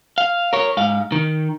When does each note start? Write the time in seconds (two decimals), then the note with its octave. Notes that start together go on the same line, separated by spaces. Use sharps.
0.18 F5
0.53 A#4 C#5
0.77 G#2 F5
1.12 D#3